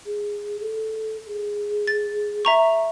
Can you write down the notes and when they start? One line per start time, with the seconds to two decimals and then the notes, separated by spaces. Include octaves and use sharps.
0.06 G#4
0.60 A4
1.27 G#4
1.87 A6
2.45 E5 A#5 C#6